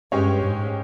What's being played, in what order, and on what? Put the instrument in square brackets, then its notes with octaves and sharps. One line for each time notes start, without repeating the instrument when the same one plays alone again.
[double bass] G2 [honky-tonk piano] G#3 C#4 G4 C#5
[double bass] G#2